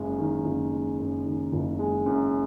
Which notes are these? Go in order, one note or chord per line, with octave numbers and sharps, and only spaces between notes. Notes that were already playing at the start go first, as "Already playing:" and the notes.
Already playing: F#1 F#2 G#3
D#3
F#1
G#3
F#2
D#3
F#1
G#3
F#2